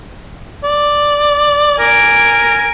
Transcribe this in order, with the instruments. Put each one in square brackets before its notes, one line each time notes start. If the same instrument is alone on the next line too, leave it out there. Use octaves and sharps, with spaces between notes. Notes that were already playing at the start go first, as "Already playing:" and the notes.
[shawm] D5
[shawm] A#4 [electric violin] G#5 D7